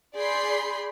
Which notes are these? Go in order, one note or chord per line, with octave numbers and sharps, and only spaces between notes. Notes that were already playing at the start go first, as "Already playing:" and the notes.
G#4 D5 B5 C6 G6 C7